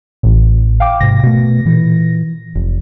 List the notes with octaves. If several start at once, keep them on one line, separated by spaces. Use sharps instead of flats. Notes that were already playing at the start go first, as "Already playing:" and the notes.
A1 A2
F5 G5 D6
G#2 C3 A#6
B2 A3
A#2 E3
F1